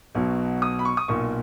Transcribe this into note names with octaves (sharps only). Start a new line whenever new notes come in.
B1 B2 F#3
D#6
B5
C#6
D#6
B1 A#2 A#3 C#6